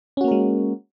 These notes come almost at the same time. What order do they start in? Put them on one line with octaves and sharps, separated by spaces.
C#4 F#4 A#3 A#4 G#3